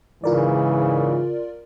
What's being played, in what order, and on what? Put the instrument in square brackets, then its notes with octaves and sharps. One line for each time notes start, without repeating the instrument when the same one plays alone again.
[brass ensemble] G#2 E3 [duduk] C#3 [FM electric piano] F4 A#4 D5